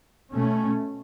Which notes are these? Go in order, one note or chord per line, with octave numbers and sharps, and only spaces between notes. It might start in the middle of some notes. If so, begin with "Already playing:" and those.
B2 A3 C#4